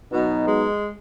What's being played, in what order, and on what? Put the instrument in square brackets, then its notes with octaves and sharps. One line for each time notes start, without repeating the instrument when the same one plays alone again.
[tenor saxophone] B2 [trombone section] F#3 B3 D#4
[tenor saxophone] G#3